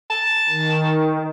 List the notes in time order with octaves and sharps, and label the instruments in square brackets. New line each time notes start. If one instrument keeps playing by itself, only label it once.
[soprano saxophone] A5
[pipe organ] D#3